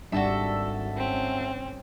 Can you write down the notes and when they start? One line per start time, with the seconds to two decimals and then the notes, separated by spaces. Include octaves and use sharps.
0.12 G#1 G3 D4 F#4 A4 E5
0.97 C4 C#4